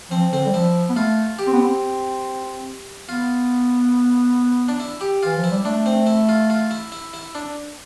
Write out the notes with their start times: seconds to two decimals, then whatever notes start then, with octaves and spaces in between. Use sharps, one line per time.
0.11 F3 C4
0.32 D3 C4
0.46 G3
0.53 F3 E4
0.89 B3
0.96 A3 F4
1.39 G4
1.47 C4
1.53 B3
1.61 C4
3.09 B3 F4
4.68 D4
4.80 E4
5.01 G4
5.23 E3 F4
5.37 F3
5.44 E4
5.51 G3
5.65 A3 D4
5.86 C4
6.07 E4
6.29 F4
6.50 F4
6.71 E4
6.92 E4
7.14 E4
7.35 D4